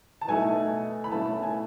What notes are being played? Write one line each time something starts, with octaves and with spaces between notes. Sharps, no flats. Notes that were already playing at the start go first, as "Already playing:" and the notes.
A5
B2 A3 D#4 G#5
B5
B2 A3 C#4 A5
G#5